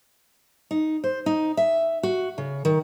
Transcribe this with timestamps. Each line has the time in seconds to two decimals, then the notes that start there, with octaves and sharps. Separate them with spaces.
0.71 D#4
1.04 C5
1.26 D#4
1.57 E5
2.03 F#4
2.38 C#3
2.65 D#3